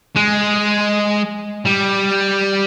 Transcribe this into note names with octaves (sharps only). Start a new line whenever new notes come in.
G#3
G3